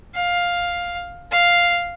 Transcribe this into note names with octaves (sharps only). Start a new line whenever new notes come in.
F5
F5